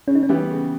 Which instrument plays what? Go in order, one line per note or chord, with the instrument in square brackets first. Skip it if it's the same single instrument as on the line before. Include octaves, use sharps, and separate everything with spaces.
[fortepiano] C#3 [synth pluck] C#4
[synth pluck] D#4
C#4
[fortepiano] E3 G3 B3 G4
C#3